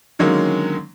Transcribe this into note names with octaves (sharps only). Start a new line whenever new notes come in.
D3 D#3 F#3 G#3 A#3 C#4